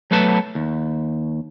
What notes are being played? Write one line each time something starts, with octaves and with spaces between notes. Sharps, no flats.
F#3 A3 B3 B4 A5
D#2